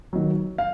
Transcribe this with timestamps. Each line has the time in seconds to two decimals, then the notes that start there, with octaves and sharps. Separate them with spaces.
0.13 D#3 F#3
0.58 F5